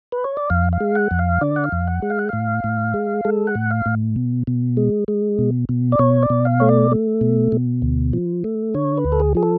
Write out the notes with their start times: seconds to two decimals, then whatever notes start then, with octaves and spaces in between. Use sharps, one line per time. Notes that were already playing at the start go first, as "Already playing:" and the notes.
0.12 B4
0.24 C#5
0.37 D5
0.50 F2 F5
0.73 F5
0.80 G#3
0.95 F#5
1.11 F2
1.19 F5
1.41 D3 D5
1.56 F#5
1.64 F5
1.72 F2
1.87 F#5
2.02 G#3
2.10 F5
2.19 F#5
2.29 A2 F5
2.64 A2
2.94 G#3
3.25 G#3 A4
3.47 F#5
3.55 A2
3.71 F5
3.86 A2
4.16 B2
4.47 B2
4.77 G#3
5.08 G#3
5.39 B2
5.69 B2
5.92 D5
5.99 B2 C#5
6.23 D5
6.30 B2
6.45 F5
6.60 A3 C#5
6.69 D5
6.91 A3
7.21 B2
7.52 B2
7.82 D2
8.13 F3
8.44 A3
8.74 D3 C#5
8.97 B4
9.05 D2
9.12 A4
9.20 G#4
9.35 F3 G#4
9.43 A4